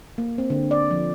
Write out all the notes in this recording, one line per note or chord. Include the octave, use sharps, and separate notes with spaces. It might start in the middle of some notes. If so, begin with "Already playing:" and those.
A#3
C4
D3
D5
F3